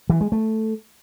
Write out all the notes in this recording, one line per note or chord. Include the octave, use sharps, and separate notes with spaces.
E3
G#3
A3